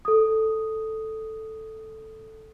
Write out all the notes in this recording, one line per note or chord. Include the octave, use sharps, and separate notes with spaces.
A4 D#6